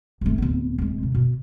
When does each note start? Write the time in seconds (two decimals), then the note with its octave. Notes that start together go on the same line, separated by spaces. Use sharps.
0.21 G#1 A3
0.38 D1 B3
0.78 D1 G#3
1.03 C3
1.15 B2